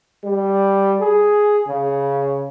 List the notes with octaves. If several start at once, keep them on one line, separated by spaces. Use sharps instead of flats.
G3
G#4
C#3